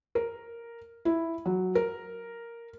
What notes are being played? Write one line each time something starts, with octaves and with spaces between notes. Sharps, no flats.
A#4
E4
F#3
A#4